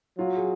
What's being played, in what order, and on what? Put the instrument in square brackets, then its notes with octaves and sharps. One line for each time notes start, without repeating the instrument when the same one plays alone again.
[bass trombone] F#3 [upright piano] F4
[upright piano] G#4